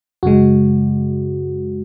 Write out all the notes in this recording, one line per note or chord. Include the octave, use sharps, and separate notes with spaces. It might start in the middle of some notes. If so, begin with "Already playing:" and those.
F#2 C#3 G#3 F#4